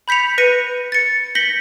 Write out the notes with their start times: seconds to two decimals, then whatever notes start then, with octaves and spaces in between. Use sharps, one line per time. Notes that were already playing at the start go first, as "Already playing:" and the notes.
0.08 B5 G6 B6 C#7 F7
0.38 B4 A#6 C#7 D#7
0.92 A6 C#7
1.35 G6 A#6 B6 C#7 F#7 G7